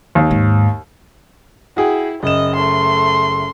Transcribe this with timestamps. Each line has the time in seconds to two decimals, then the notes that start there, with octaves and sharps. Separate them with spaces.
0.15 D#2
0.31 G#2
1.77 E4 F#4 G#4 G5
2.23 F#1 D#5 E7
2.56 A3 C6